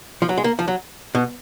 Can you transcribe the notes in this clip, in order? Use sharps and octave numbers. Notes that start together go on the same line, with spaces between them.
F3
F#3
G#3
A#3
F3
F#3
B2